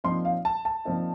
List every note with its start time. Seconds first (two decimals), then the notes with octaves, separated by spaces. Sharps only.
0.04 A#2 F3 C4 D#4 C6
0.25 F5
0.45 A5
0.65 A5
0.85 A#2 F3 C4 D#4